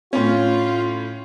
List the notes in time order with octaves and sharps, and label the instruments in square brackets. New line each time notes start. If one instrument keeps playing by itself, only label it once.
[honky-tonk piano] A2 C#4 [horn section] F4